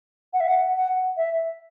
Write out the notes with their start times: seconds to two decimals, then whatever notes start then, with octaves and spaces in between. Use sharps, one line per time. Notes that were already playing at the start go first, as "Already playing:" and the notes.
0.33 F#5
0.40 E5
0.47 F#5
0.74 F#5
1.17 E5